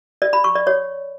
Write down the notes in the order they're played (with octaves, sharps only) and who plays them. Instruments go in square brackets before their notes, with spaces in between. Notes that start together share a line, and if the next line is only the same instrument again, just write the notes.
[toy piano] D5
B5
C#6
D5
C#5